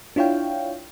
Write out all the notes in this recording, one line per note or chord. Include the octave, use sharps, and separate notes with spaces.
D4 E4 F4 C#5 F5 G5